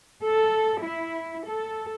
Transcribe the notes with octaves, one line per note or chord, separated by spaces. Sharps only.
A4
E4
A4